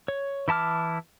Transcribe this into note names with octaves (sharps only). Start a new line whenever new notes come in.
C#5
E3 E4 A5 D6 F6